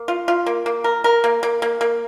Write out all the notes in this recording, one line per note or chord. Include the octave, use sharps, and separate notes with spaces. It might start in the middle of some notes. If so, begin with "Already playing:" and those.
Already playing: A#3
F4
F4
A#3
A#3
A#4
A#4
A#3
A#3
A#3
A#3